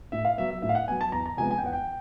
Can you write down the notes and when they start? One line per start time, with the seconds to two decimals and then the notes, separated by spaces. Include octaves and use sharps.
0.12 A2 E5
0.25 F5
0.38 F#3 B3 E5
0.50 E5
0.62 A2 E5
0.69 F5
0.75 F#5
0.88 F#3 B3 G#5
1.01 A5
1.12 E2 A#5
1.26 A#5
1.37 C3 F3 G#3 B3 G#5
1.51 G#5
1.58 G5
1.63 E2 F#5
1.73 G5